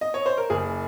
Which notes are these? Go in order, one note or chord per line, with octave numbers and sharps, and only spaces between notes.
D#5
C#5
C5
A#4
F#1 G#4